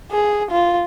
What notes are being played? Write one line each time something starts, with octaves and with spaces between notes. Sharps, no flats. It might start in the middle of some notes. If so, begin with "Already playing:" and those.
G#4
F4